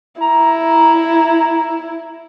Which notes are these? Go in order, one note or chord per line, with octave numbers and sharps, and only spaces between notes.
E4 A#5